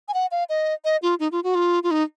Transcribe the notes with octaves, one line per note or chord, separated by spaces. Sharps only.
G#5
F#5
F5
D#5
D#5
F4
D#4
F4
F#4
F4
F4
D#4